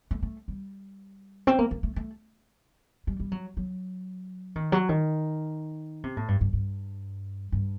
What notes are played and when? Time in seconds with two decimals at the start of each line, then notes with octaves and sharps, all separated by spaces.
0.11 A3
0.23 A3
0.48 G3
1.47 C4
1.59 A#3
1.71 A#3
1.83 A3
1.96 A3
3.07 G3
3.20 G3
3.32 F#3
3.57 F#3
4.56 D#3
4.72 F#3
4.89 D#3
6.04 C3
6.17 A2
6.28 G2
6.41 G2
6.53 G2
7.52 G2